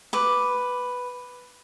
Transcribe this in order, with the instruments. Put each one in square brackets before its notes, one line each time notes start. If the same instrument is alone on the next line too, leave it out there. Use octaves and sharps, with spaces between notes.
[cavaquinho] B4 D6